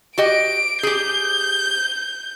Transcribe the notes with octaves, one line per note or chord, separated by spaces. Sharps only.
F#4 G4 D#5 D7
G4 G#4 G6